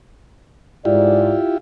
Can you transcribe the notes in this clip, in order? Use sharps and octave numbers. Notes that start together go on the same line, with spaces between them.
G#2 E4 F4 G4 D5